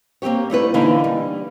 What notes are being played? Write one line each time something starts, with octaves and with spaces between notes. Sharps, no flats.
A#3 C4 D#4 G4 C#5
G3 A3 E4 B4
D3 E3 A#3 C#4 D#4 E4
G3